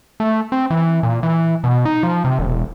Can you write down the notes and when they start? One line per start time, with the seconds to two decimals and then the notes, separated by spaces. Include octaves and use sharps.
0.20 A3
0.52 C4
0.70 E3
1.03 A#2
1.23 E3
1.64 B2
1.85 D#4
2.03 F3
2.25 C3
2.39 E1